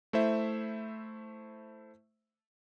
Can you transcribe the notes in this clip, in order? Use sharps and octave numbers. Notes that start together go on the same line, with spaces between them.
A3 E4 C5 E5